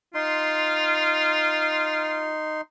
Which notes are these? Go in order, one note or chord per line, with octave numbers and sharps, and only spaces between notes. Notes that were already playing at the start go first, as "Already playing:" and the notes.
D#4 F4 C6